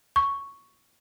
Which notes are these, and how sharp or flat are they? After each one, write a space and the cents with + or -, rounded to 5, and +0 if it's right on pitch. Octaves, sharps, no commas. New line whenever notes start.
C#6 +5